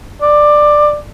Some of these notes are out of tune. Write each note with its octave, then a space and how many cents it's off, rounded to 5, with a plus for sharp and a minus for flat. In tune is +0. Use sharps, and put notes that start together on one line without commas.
D5 +15